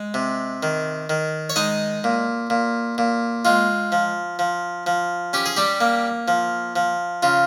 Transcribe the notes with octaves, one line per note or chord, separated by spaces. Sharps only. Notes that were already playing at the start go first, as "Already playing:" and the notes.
Already playing: G#3
C3
D#3
D#3
C#5
G#3 D#4 D#5
A#2
A#2
A#2
G#3 F4
F3
F3
F3
C#4 G4
G#4
G3 G4
A#3
F3
F3
C#3 F4